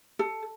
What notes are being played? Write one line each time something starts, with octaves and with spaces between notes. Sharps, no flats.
A4